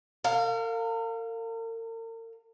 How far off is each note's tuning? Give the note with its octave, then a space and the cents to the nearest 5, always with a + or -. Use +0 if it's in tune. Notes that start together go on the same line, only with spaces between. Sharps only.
A#4 -45 F5 +10